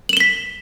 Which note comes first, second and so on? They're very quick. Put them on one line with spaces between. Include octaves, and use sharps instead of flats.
F#7 E7 G7 B6